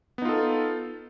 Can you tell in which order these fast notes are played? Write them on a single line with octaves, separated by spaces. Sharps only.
B3 D#4 F4 A4